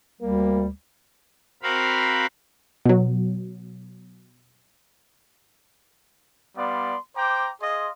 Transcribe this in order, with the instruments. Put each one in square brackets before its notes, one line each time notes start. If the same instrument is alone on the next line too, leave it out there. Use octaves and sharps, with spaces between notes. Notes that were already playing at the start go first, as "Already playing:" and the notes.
[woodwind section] D2 G3 [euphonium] A#3
[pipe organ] C4 F#4 A#4 F5 B5
[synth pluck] B2 F#3
[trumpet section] G3 B3 D5 F5 C6
C5 G5 A#5 D6
G#4 D#5 F5 C6